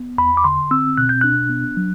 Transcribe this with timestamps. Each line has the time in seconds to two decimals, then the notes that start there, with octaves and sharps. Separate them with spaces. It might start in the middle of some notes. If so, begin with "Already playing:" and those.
Already playing: B3
0.18 E2 B5
0.37 D6
0.44 D3 C6
0.71 C4 E6
0.97 B2 F#6
1.09 G6
1.21 D4 F#6
1.50 B3
1.77 F#3